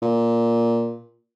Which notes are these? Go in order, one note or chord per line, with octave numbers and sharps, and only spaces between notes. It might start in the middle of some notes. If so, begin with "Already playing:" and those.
A#2